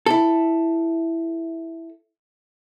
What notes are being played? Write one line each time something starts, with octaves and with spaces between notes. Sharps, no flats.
E4 A4